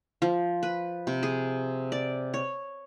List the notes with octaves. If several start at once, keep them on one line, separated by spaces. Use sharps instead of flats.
F3
B4
C3
G#4
D5
C#5